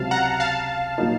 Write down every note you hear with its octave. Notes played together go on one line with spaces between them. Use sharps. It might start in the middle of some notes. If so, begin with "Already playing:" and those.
Already playing: C#2 C3 F#3 F5 A5
F#5 A#5
F5 A5
A#2 F#3 A#3 D#4